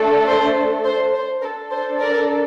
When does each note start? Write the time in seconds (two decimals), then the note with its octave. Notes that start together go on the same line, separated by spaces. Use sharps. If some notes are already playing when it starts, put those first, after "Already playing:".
Already playing: A3 D4 A4
0.27 C5
0.84 C5
1.13 C5
1.42 D4 A4 A#4
1.71 C5
2.00 A#4 D5